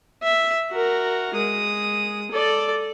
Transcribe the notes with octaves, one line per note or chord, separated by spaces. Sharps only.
E5
F#4 A#4
G#3 D#6
A4 D5